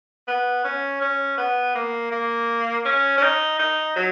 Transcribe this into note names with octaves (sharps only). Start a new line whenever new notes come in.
B3
C#4
C#4
B3
A#3
A#3
C#4
C#4
D#4
D#4
F#3